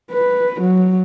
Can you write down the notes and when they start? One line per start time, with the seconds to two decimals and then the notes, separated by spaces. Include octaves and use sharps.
0.12 B4
0.61 F#3